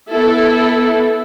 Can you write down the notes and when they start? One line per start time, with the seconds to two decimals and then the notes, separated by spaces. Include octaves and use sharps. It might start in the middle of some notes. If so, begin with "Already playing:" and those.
0.11 B3 E4 A4